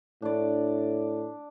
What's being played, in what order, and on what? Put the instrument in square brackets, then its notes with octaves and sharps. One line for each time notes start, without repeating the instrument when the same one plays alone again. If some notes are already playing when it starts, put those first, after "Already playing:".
[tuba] A2 [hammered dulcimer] D4 D5